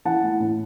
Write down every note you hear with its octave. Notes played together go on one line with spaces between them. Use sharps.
E3 F#5 A5
A3 E4
A2